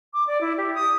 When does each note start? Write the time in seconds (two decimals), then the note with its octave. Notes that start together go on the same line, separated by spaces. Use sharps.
0.13 D6
0.27 D5
0.41 E4
0.57 G4
0.74 D#6